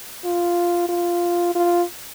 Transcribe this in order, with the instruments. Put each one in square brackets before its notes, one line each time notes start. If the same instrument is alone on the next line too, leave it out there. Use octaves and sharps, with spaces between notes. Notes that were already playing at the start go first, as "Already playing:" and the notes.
[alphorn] F4
F4
F4